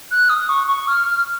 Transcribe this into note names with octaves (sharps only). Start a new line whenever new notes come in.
F#6
D#6
C#6
C#6
F6